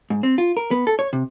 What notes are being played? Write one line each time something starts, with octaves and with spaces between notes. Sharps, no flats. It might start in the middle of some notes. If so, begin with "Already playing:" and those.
G#2
C4
F4
A#4
B3
A4
C#5
C3